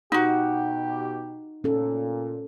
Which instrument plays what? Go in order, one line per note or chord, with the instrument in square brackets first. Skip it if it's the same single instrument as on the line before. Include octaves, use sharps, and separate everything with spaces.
[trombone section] B2 G4 [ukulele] D#4 F#4
[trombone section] A#2 [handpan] C#4 A4